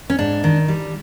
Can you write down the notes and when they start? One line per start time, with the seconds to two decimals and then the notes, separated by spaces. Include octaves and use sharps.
0.10 C#4
0.19 G#2 D4
0.44 D#3
0.68 G3